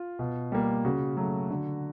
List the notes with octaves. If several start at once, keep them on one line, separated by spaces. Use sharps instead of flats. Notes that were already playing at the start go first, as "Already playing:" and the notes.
Already playing: F4
B2
G3 A#3
C#3 F#4
F#3 A3
D3